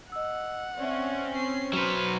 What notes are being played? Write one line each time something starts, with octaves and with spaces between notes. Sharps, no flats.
D#5 F#5 E6
C4 C#4 D5 E5
C5 C7
F#3 B4 C5 F6 C#7 E7